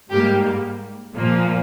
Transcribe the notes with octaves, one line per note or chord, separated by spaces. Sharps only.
G#2 G3 A#3 G4
A#2 F3 A#3